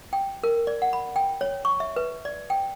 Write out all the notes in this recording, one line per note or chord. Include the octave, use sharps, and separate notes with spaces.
G5
A#4
D5
F#5
B5
G5
C#5
C#6
E5
B4
D5
G5